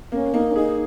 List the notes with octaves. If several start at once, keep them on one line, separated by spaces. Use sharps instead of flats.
A#3 C#4
A#3 D#4
C#4
D#4 G#4